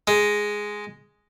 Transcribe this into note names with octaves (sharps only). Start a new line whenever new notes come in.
G#3